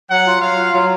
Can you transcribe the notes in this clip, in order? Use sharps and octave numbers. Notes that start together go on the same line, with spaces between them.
F#3 F#5
F4
F#3 F5
F4
F#3